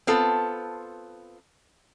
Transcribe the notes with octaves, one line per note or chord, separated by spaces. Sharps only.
B3 C4 F4 A4